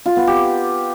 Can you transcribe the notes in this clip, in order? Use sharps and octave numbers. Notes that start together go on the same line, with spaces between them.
F4
B3
G4